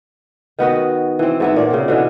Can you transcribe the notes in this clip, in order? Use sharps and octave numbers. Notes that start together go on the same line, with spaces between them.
D#3 B3 F#4 D#5
E3 C4
G#2 B3 E4
A#2 C#5 D5
C#3 C4
B2 D3 E3